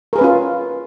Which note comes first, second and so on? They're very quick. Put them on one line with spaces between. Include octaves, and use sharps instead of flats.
A#4 G#4 B4 C#4 F4